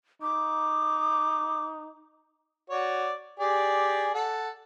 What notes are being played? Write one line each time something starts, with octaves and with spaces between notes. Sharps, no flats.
D#4 D6
F#4 C#5 D5
G4 G#4 D5
A4 F#5